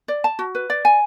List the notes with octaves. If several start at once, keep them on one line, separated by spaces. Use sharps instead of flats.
D5
A5
F#4
B4
D5
G#5